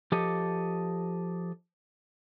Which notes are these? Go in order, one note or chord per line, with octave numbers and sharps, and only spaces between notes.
F3 G4 A4 D#5